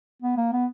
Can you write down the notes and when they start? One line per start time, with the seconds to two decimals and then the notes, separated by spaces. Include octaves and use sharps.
0.22 B3
0.37 A#3
0.52 B3